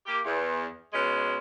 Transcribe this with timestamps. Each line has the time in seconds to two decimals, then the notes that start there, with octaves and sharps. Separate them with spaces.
0.07 A#3 G4
0.25 E2
0.94 B2 G#3 C#4